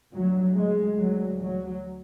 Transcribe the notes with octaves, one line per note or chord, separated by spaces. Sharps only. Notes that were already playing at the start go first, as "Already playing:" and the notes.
D2 F#3
G#3
D2 F#3
F#3